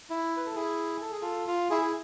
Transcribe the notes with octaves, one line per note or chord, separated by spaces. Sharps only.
E4
B4
A4
E4 G#4
A4
G#4
F4 A4
F4
E4 G#4
G#4